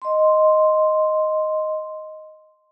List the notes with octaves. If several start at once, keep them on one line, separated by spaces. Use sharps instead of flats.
D#5 C6